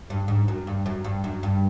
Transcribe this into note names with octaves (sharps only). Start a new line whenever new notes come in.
G2
G#2
F#2
G2
F#2
G2
F#2
G2